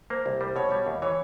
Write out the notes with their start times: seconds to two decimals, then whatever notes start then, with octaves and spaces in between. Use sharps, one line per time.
0.10 A#3 C5
0.26 C2
0.41 G3 C5
0.56 B2 C#5
0.71 G3 C#5
0.87 D#2
1.02 E3 C#5